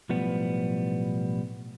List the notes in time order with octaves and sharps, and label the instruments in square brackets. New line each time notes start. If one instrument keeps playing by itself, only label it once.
[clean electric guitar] B1 A2 F3 G3 B3